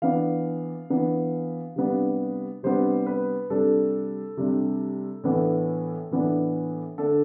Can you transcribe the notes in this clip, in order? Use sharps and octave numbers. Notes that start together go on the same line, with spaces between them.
E3 B3 D4 F5
E3 B3 D4
C3 G3 B3 D4
C3 G3 B3 D4 C5
B4
C3 G3 D4 A4
C3 G3 D4
A2 E3 B3 D4
A2 E3 B3 D4
D3 A3 D4 A4